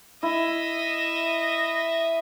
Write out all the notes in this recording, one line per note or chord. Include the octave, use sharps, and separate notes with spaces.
E4 D#5 E5